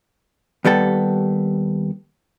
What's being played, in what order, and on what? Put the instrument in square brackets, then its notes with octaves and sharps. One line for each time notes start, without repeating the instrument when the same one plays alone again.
[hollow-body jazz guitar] D#2 G3 B3 A4